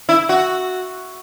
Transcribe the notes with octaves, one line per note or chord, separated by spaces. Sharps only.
E4
F#4